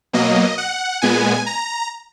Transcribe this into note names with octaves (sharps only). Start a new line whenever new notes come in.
B2 F#3 A#3 D#5
F#5
A#2 G#3 B3 G#5
A#5